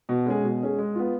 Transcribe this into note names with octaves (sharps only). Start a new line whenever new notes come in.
B2
G#3 C#4 G#4
B2
G#3 C#4 G#4
G#3
B3 F4